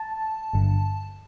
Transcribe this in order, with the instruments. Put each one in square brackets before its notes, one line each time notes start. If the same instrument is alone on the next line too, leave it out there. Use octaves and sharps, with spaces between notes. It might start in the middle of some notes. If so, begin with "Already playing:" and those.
Already playing: [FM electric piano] A5
G1 G2 D3